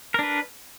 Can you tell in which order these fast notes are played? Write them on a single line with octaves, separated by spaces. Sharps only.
A#4 D4 B4